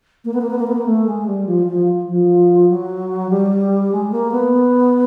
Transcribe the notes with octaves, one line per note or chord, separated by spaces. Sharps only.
A#3
B3
A#3
B3
A#3
B3
A#3
A3
G#3
G3
F3
F3
F3
F#3
G3
G#3
A#3
B3